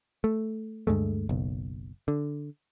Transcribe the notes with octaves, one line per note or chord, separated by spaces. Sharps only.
A3
D2 G2 G#3 A3
F#1 B1
D3